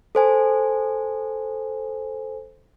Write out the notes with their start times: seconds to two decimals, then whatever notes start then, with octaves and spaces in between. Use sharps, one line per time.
0.15 A4 C5 G#5